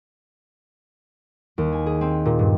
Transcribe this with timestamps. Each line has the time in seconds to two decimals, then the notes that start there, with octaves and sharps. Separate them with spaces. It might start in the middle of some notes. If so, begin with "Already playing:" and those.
1.58 D#2
1.72 G#5
1.86 G#4
2.01 C4
2.25 A#2
2.39 G2